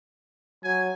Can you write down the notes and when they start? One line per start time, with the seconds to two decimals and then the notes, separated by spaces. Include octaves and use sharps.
0.64 F#3 G#5